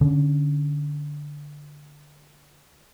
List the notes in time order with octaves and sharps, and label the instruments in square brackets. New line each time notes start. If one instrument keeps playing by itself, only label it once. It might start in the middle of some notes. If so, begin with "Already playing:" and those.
[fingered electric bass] D3 C#4